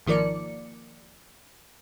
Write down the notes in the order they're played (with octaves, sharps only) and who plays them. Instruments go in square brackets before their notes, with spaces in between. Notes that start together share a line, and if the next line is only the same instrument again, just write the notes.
[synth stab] G#1 D#3 F3 A#3 D5 C#7